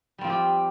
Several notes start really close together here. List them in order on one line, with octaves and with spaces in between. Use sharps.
G3 C4 F3 F4 G4